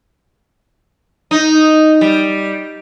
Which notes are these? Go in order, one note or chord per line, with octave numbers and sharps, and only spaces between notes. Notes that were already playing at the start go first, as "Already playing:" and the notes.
D#4
G3